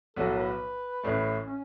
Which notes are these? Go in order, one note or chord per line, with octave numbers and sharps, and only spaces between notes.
B1 A2 F#3 B3 F#4 A4
B4
A1 A2 A3
C#4